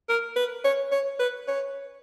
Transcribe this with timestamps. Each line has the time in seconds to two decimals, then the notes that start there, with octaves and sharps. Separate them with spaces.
0.09 A#4
0.36 B4
0.64 C#5
0.92 C#5
1.19 B4
1.48 C#5